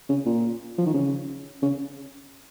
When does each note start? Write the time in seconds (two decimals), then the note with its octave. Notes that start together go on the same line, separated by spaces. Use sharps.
0.09 C#3
0.26 A#2
0.78 F3
0.86 D#3
0.94 C#3
1.62 C#3